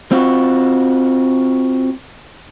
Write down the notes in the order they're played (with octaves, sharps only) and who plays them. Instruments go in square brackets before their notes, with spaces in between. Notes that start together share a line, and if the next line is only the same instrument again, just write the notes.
[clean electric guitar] C4 F4 F#4